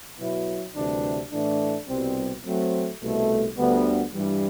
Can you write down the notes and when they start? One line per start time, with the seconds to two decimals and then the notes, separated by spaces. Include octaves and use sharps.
0.18 B2 F#3 B3 E4
0.74 D2 C3 E3 G3 D4
1.31 A2 E3 A3 D4
1.88 C2 B2 G3 C4
2.44 F#3 A3 C4
3.00 C2 B2 A3
3.57 D2 D3 G3 B3
4.14 G2 E3 G3